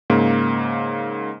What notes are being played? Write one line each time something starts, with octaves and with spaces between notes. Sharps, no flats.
G#2 C#3 A#3